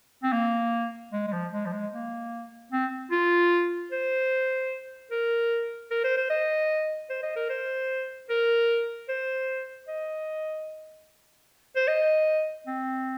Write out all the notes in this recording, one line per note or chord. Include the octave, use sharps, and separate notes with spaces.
C4
A#3
G#3
G#3
F3
G#3
F3
G#3
A#3
C4
F4
C5
A#4
A#4
C5
C5
D#5
C5
D#5
A#4
C5
A#4
C5
D#5
C5
D#5
C4